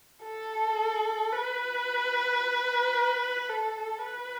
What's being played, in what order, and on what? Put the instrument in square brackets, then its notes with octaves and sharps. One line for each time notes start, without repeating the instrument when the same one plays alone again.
[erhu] A4
B4
A4
B4